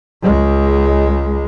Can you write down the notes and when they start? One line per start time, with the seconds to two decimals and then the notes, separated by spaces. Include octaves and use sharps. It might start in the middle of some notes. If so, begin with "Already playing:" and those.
0.23 C#2 G#3